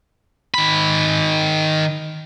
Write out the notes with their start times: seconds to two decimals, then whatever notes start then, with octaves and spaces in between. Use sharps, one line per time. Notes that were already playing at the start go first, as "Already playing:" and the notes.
0.54 D#3 B5